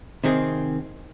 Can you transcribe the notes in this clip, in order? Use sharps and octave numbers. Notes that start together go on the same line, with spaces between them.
C3 D#3 C4 G#4